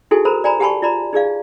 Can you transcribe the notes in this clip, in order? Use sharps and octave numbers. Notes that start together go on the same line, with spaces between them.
D#4 E4 F#4 G#4 A4 G#5
A4 A#4 C5 A#5 B5
D5 G#5 A#5 B5
G4 F#5 G#5 A5 B5 C#6
F4 D5 A#5 B5
D#4 G#4 D5 F5